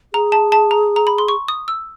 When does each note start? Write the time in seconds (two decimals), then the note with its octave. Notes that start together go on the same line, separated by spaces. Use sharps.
0.14 G#4 A#5
0.32 A5
0.52 A5
0.71 A#5
0.96 A#5
1.07 B5
1.18 C6
1.28 C#6
1.48 D#6
1.68 E6